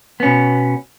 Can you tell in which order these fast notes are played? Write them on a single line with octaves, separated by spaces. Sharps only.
B3 C#4 B2